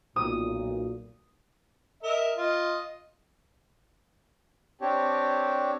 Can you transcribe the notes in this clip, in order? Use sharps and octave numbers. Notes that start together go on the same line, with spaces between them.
B1 A#2 D#6
A#4 D#5 E5
F4 D#5
C4 D4 G4 C#5